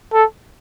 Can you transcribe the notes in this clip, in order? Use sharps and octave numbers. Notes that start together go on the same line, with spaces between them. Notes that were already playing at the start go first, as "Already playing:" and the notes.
A4